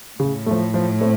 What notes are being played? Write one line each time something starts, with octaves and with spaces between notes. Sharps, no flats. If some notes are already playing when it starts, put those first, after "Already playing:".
A2 C#3
F3 A3
F3
A3 C4